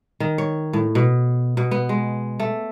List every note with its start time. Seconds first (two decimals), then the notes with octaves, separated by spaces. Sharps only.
0.20 D#3
0.38 C#5
0.73 A2
0.95 B2
1.57 B2
1.71 B3
1.89 G#3
2.40 A3